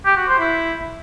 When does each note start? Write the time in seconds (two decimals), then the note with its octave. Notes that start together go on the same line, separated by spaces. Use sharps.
0.05 G4
0.17 F#4
0.28 C5
0.39 E4